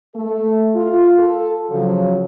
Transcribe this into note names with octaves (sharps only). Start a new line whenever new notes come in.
A3 A4
F4
A4
C#3 F3 F#3